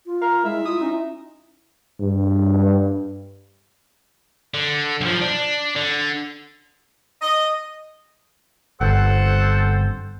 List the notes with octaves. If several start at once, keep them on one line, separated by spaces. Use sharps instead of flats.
F4
A#4 F5
G#3 E4 E5
E4 F4 D#6
C#4 D#4
G2
D3
B1 F3
D4
D3
D#5
G1 C4 A4 C5 F#5